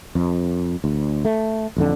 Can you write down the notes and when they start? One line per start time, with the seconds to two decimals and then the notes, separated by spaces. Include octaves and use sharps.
0.15 F2
0.84 D2
1.25 A3
1.77 A1 F2 D3